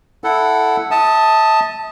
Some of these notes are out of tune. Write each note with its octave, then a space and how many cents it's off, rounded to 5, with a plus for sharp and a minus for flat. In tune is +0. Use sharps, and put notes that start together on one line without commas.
E4 +0 A4 +0 F#5 +0
E5 -40 A5 +5 D#6 +0